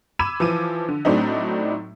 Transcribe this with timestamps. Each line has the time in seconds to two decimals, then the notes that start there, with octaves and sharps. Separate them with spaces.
0.19 B5 D6 E6 G#6 D#7 E7
0.40 E3 F3 D6 D#7
0.88 D3
1.05 A2 F#3 A3 C4 D4 D#4